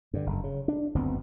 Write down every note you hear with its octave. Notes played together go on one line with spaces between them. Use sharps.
G2 D3
F#1
C#3
D4
F#1 D2 B3 C4